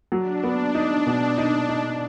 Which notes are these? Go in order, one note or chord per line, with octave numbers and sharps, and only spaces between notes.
F#3 D4
B3
D#4
B2
D#4
D#4